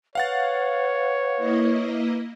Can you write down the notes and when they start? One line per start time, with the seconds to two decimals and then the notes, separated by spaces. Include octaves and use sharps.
0.15 B4 C#5 F5 F#5 A6
1.37 A#3 E4 D#5